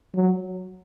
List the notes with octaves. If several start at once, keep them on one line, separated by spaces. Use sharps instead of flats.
F#3